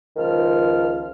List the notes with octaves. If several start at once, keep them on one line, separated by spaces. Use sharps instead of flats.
C#2 D#3 F3 F6